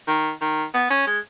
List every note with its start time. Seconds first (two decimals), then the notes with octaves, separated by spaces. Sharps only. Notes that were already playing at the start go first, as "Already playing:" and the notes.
0.08 D#3
0.41 D#3
0.74 B3
0.91 C#4
1.07 G#3